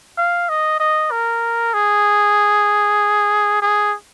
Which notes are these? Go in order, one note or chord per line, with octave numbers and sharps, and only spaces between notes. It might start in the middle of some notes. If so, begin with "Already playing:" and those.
F5
D#5
D#5
A#4
G#4
G#4